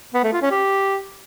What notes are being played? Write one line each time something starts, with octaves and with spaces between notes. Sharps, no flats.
B3
A3
F4
C#4
G4